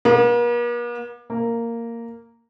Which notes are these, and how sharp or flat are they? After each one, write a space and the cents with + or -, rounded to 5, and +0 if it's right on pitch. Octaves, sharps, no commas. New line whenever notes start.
A#3 +45
A#3 -10